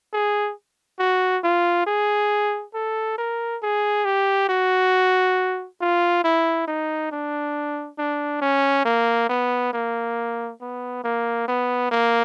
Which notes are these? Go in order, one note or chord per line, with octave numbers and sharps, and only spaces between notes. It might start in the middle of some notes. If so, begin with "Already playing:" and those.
G#4
F#4
F4
G#4
A4
A#4
G#4
G4
F#4
F4
E4
D#4
D4
D4
C#4
A#3
B3
A#3
B3
A#3
B3
A#3